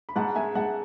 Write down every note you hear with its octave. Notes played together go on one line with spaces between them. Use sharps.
B5
G#2 F#5 A5
G#3 E5 G#5
G#2 F#5 A5